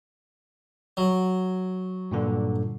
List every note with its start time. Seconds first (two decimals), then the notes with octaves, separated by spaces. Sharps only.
0.97 F#3
2.11 G2 A#2 D3